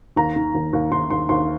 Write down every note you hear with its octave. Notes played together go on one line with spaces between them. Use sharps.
D#2 A#5
D#3
D#2
D#2
D#2 C6
D#2 C6
D#2 C6